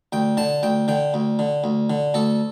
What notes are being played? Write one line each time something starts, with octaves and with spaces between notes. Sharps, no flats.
D2 G5
D3 A5
D2 G5
D3 G5
D2
D3
D2
D3
D2 A4